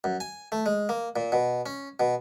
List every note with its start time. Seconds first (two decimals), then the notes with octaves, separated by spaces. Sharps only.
0.04 F#2
0.20 G#5
0.52 A3
0.66 G#3
0.89 A#3
1.16 A#2
1.32 B2
1.66 C#4
2.00 B2